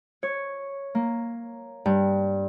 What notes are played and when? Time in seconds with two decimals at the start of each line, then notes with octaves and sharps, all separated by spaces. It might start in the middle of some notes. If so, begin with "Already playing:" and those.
0.23 C#5
0.95 A#3
1.86 G2